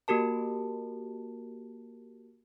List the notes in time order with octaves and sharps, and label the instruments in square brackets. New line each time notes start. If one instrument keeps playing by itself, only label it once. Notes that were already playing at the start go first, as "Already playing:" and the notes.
[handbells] A#3 F#4 G4 A#4 A5